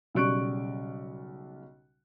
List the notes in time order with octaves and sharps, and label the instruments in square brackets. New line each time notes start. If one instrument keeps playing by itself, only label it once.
[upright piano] B1 C#3 G3 C#6 F#6 D7